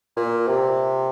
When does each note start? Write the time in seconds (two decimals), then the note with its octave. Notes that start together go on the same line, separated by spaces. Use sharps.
0.17 A#2
0.48 C3